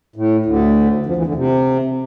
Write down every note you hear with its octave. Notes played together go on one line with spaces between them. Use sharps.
A2
D2 D3
F2 F3
E2 E3
D2 D3
C3